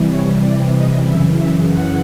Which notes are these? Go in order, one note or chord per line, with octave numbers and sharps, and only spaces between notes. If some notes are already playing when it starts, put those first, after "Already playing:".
Already playing: C3 E3 G3
C#5
D5
D#5
F#2 C#3 E3 E5
E5
F#5